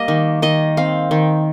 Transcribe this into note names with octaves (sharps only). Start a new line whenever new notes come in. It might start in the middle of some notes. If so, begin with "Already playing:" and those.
Already playing: G3 A#3 D#5
D#3
D#3 D#5
C4 F5
D#3